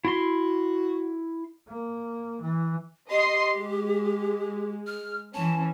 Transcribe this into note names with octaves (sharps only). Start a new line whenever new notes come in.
E4 F#4 C6
A#3
E3
G4 D#5 C6
G#3
F6
E3 C#4 A5